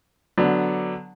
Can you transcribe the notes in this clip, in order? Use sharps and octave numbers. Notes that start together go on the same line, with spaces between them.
D3 F#3 B3 D4